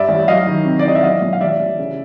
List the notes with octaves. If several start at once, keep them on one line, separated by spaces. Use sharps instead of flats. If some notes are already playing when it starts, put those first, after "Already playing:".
Already playing: G2 D5 E5
A1
F#3 D#5 F5
D#3
C3
D5
E3 D#5
E5
F#3 D#5 F5
B1
F5
A1 D5 E5
A1
C#3